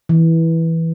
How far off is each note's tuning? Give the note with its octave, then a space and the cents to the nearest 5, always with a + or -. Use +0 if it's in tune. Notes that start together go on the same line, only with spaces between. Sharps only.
E3 -10